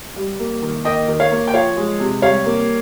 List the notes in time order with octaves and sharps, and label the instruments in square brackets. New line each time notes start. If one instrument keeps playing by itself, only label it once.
[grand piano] G3
A#3
D#3
A#3 D#5 G5
D#3
C#5 F5
A#3
G5
F3 C#5 F5
G#3
C3
G3 C#5 F5
A#3